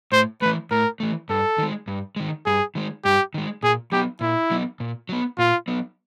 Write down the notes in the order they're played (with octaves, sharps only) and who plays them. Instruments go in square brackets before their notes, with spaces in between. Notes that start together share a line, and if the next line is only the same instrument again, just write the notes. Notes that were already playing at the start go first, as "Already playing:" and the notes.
[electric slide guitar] A2 [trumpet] C5
[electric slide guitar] E3 A3 [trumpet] B4
[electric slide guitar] A2 [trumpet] A#4
[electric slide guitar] E3 A3
[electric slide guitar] G2 [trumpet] A4
[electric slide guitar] D#3 G#3
G2
D#3 G#3
[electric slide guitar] G2 [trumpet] G#4
[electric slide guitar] D#3 G#3
[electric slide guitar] G2 [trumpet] G4
[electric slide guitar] D#3 G#3
[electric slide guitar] A#2 [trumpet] G#4
[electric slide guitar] F#3 B3 [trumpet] G4
[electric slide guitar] A#2 [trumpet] E4
[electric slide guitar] F#3 B3
A#2
F#3 B3
[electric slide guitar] A#2 [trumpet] F4
[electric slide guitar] F#3 B3